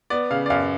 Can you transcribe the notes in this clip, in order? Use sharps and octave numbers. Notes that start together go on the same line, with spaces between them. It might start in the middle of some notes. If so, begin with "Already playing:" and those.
B3 D5
C#3 F5
D5
F#2 F5